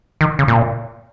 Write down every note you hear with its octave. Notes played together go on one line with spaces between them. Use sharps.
D#3
C#3
A#2